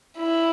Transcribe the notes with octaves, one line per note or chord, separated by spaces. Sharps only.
E4